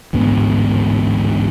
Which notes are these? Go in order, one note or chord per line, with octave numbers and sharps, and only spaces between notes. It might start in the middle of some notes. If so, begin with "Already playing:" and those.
A1 D2 G#2 B3